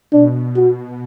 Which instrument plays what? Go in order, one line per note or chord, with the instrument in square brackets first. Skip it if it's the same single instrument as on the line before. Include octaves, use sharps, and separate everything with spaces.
[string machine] B2 [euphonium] D4
[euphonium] F#4